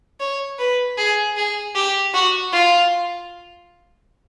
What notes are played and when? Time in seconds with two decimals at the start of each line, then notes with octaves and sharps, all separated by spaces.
0.20 C#5
0.59 B4
0.98 G#4
1.37 G#4
1.75 G4
2.14 F#4
2.53 F4